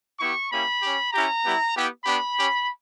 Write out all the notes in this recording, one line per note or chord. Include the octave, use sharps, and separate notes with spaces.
B3 E4 G4 C#6
A#3 C#4 E4 G4 B5
C#4 G4
C#4 E4 G4 A#5
G3 B3 E4 G4
B3 E4 G4
B3 D4 G4 B5
C#4 G4